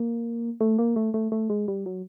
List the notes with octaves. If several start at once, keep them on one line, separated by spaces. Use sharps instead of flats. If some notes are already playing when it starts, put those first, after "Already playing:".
Already playing: A#3
A3
A#3
A3
A3
A3
G#3
G3
F#3